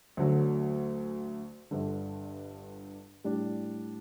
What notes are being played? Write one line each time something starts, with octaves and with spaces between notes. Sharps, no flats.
D2 D3 F#3
G1 G2 D3
A2 G3 D4